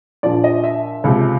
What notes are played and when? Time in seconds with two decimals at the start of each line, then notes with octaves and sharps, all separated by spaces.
0.23 A#1 A#2 F3 D5
0.44 D#5
0.64 E5
1.04 C#2 C3 F3